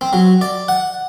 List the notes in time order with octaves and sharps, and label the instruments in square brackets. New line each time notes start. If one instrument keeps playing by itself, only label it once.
[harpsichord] C4
F#3
D5
F#5